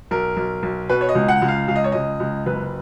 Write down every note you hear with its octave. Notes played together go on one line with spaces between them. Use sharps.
B1 A#4
B1
B1
B2 B4
C#5
D#5
C#2
F#5
C#2
F5
C#2 F5
D#5
C#5
C#2 D#5
C#2
F#1 B4